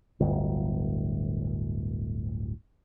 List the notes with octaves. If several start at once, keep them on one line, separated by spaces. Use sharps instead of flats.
D1 G1